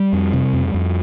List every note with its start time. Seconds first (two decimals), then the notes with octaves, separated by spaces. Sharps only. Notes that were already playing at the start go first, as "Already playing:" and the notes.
Already playing: G3
0.13 F2
0.33 C3
0.53 F2
0.74 F2